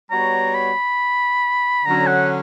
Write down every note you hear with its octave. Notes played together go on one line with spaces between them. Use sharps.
G3 B3 F#4 C#5 A#5
B5
D3 F#3 C#4 A#5
F#5